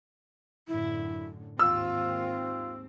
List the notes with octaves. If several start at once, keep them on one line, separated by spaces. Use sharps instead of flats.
F#2 A2 D3 E4
D#2 G#2 C4 F4 E6